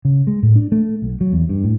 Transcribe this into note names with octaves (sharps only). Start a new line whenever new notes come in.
C#3
G#3
A2
D4
A3
B1
F#3
E2
G2
A2